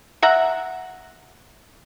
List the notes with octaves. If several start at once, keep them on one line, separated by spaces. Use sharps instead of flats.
E5 F#5 A#5